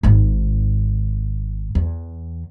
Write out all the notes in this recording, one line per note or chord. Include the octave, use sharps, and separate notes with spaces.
G#1 G#2
E2